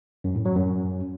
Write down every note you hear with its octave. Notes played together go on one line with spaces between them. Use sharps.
F#2
A2
F#3
F#2